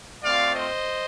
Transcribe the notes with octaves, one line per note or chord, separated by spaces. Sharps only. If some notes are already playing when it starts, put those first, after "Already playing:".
A3 C4 F4 D5 F5
C5 D#5